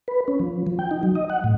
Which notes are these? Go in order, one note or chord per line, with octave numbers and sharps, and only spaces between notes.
B4
C#4
F3
F3
G5
D#4
F#3
D#5
F#5
A2